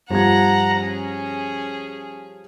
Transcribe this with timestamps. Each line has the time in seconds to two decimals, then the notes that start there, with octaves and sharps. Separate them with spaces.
0.11 G2 F3 G3 F#5 A#5 G#6
0.78 C#4 G#4